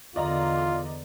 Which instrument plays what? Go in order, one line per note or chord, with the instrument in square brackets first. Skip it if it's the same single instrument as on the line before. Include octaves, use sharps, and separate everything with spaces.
[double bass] E2 D3 [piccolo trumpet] F4 [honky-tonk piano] D5 D#5 A#5